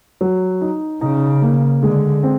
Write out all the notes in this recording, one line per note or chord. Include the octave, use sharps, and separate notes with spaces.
F#3
D#4
C#3 D#4
A#3
D3 G#3
C4